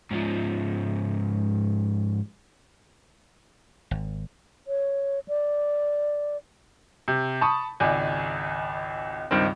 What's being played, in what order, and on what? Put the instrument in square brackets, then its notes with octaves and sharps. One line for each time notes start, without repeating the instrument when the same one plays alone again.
[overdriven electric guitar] G#2 F3
[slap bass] G#1
[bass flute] C#5
D5
[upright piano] C3
A5 B5 C#6 D#6
G#1 C#2 D5 G#5
C#2 G2 D#3 C4